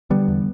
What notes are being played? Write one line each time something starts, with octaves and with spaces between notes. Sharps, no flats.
D3 G3 B3
E2